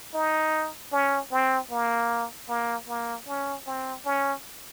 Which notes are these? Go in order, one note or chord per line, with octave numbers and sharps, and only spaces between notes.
D#4
C#4
C4
A#3
A#3
A#3
C#4
C4
C#4